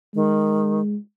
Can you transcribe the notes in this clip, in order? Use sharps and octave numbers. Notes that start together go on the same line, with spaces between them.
D#3 G#3